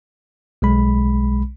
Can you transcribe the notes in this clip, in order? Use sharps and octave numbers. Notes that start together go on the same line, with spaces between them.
B1 G#3 B5